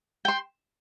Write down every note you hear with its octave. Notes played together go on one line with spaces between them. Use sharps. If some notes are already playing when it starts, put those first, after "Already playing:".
G5 C6